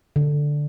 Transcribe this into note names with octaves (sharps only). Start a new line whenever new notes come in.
D3